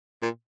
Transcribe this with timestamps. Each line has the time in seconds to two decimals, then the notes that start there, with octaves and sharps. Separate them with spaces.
0.22 A#2